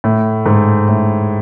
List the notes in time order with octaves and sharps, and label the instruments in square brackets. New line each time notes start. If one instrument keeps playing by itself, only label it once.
[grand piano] A2
G#2
A2